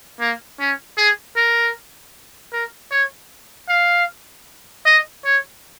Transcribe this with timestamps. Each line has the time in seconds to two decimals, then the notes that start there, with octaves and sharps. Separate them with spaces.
0.20 A#3
0.60 C#4
0.98 G#4
1.37 A#4
2.53 A#4
2.91 C#5
3.69 F5
4.86 D#5
5.25 C#5